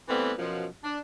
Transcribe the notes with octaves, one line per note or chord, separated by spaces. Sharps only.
E3 G3 A3 B3 C4
F#2 B2 F3
D4